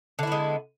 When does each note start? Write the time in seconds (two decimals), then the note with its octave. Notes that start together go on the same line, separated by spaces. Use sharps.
0.19 D3
0.23 E4
0.27 B3
0.32 G#3